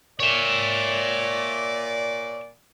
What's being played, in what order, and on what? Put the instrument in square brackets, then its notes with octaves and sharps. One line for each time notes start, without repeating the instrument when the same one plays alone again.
[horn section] A#2 D5 [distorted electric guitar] C#5 E5